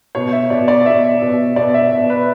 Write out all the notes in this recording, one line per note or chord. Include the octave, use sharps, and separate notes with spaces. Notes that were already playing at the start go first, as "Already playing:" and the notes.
B2 C#5
E5
B2 D5
D5
B2 E5
B2
B2 D5
E5
B2
B4